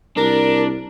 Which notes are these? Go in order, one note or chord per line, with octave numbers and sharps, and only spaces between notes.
C2 D4 A#4